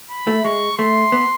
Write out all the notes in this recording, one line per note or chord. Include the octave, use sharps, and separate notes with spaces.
B5
A3
G#3 C#6
A3 C6
B3